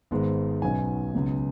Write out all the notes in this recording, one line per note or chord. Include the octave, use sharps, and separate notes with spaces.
G#1 G#2 G#3 B3
B1 B2 F#3 C#4 G#5
C#2 C#3 F#3 B3